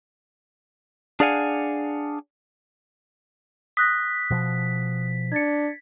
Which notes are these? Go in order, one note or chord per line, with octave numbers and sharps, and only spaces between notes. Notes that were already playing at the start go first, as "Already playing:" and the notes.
D4 G#4 D5 F5 F#5 G#5
D#6 F#6 A#6 B6
B2 F3
D4 G#6 A6 C#7